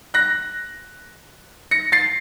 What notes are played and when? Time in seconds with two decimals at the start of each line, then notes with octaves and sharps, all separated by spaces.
0.14 F#6 A#6
1.71 A#6 C#7
1.92 A6 C7